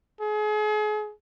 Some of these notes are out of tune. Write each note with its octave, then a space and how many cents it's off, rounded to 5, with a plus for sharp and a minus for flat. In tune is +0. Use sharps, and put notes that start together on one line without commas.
G#4 +35